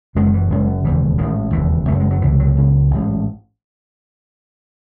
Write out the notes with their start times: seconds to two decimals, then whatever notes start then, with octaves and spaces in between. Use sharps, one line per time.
0.15 F#1 F#2 C#3 G#3
0.27 D#3
0.33 E3
0.50 F#1 F#2 C#3 G#3
0.67 F#3
0.84 E1 D#2 C#3 E3
1.18 A1 G#2 D#3
1.53 E1 D#2 C#3 E3
1.87 F#1 F#2 C#3 A3
2.00 G#3
2.11 F#3
2.22 C#2 C3 E3
2.40 F#3
2.56 C#2 C#3
2.91 A1 G#2